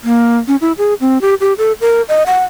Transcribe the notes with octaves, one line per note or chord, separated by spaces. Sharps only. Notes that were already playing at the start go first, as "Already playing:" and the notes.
A#3
C#4
E4
G#4
C4
G4
G4
A4
A#4
D#5
F#5